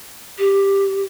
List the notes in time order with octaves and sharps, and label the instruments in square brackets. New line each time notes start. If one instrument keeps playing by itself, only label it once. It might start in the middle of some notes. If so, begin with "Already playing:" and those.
[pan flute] G4